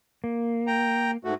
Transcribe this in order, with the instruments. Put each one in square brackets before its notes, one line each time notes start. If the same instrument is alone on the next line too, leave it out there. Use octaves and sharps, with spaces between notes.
[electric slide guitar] A#3
[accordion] G5 A#5
G#2 A3 F#4